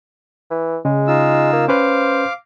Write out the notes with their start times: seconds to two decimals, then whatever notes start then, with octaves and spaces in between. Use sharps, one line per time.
0.51 E3
0.85 C#3 G#3
1.07 D#4 F4 E6
1.53 A#3
1.68 C#4 B4 C5 F5 D6